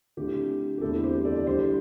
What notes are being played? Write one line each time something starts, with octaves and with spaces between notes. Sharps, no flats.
D3 A3 C4 E4 G4
G4
E2 D3 A3 C4 E4 A4
G4 C5
A4 D5
D5
D3 G3 E4 G4 C5